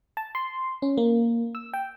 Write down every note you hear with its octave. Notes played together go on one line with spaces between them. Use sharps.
A5
C6
C#4
A#3
E6
G5